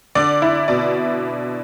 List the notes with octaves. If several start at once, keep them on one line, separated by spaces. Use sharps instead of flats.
D3 D5
E4
B2 D5